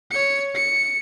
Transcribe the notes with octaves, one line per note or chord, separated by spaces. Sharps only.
C#5 C#7
C#7